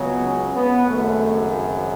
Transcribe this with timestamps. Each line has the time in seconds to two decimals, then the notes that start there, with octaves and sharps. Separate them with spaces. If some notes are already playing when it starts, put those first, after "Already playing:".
Already playing: C#2 C#3 F#3 B3
0.24 C#4
0.55 B3
0.86 G#1 F#2 C#3 A3